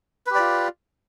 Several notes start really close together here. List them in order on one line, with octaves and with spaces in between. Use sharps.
B4 G4 D5 F4